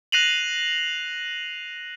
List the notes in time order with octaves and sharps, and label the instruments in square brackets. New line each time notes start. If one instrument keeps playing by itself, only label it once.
[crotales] F#6 A#6 C7 D#7 F7 F#7